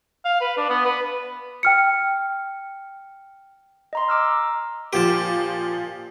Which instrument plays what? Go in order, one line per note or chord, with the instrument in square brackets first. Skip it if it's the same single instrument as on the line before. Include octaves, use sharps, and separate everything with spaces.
[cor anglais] F5
B4
D4
B3
B4
[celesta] G5 F6 C#7
[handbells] D#5 A#5 C6
A#5 D6 E6 F6
[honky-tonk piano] A#2 F3 [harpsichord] G4 A5